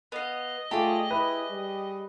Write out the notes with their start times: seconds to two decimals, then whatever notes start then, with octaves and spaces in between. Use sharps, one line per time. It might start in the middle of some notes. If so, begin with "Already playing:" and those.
0.12 B3 D#5 F5
0.71 A3 F4 G4 G#4 D5
1.11 E4 B4
1.50 G3